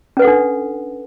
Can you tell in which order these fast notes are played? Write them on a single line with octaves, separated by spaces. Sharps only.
C#4 B4 F#5 A4 D4